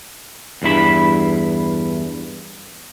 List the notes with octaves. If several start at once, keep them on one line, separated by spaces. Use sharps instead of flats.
E2 G2 E4 B5